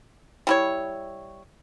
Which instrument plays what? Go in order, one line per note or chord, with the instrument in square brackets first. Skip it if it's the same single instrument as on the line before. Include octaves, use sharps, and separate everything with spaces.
[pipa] G3 E4 C#5